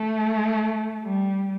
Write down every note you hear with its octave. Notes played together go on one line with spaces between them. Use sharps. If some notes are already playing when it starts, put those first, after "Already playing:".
Already playing: A3
G3